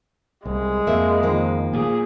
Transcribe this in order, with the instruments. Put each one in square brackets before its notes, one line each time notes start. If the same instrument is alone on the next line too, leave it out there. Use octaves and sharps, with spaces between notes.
[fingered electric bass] C2 [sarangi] G#3
[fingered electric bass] F2 [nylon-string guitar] A#3 E5
[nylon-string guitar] D#3 F3 A#3
[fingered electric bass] A#2 [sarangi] G#4